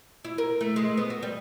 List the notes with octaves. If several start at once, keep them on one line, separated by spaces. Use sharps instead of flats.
E4
A#4
A3
G#3
B3
F#4
G3